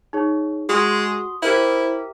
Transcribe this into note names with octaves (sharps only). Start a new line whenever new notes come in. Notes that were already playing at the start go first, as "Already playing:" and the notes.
D#4 G#4 C#5
G#3 F#4 C6 D#6
E4 G4 A#4 C5 E5